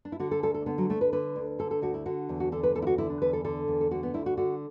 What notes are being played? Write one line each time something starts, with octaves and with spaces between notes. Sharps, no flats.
D4
E4
D3 F#4
A4
D2 A4
A4
D3 B3
F#3
D2 A3
B4
D3 B4
D2
D3 A4
A4
D2 F#4
E4
D3 F#4
E2
F#4
D3 A4
B4
E2 A4
E4
F#4
D3 E4
D4
E2 B4
A4
D3 A4
E2
A4
D3 F#4
B3
D2 E4
F#4
D3 F#4